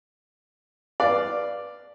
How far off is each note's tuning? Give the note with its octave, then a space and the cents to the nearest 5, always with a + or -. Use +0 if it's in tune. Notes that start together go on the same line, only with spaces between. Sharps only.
B4 -10 D5 +0 F5 -5